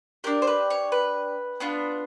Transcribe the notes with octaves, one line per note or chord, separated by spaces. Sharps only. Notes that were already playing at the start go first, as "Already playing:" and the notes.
D4 G4 A#4
C5
B4
C#5
B4
B3 D4 F4